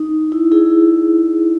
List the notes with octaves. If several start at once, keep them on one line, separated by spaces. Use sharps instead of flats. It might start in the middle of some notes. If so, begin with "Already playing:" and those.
Already playing: D#4
E4
E4 G#4